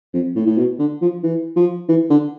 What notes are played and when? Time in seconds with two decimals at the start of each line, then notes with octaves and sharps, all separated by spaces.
0.14 F2
0.36 A2
0.46 A2
0.58 B2
0.79 D3
1.01 F3
1.23 E3
1.56 F3
1.89 E3
2.10 D3